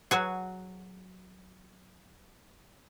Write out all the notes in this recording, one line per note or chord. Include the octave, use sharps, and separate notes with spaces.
F#3 F#4 G#4